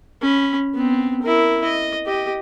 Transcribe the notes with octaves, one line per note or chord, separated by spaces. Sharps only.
C#4 B5
B3 C4
E4 A#4
D#5
G4 D#5